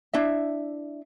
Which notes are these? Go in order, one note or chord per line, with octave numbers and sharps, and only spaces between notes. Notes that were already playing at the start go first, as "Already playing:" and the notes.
D4 E4 E5